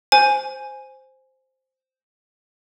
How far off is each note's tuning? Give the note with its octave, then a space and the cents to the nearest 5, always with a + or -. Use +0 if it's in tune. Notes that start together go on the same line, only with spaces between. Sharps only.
C5 +0 G#5 +0